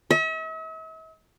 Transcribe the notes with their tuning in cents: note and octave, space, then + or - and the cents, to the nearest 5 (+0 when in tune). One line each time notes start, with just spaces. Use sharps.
E5 -45